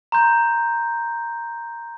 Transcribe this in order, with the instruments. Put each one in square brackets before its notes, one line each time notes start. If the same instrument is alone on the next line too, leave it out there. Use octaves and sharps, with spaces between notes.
[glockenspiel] A#5 C6 G6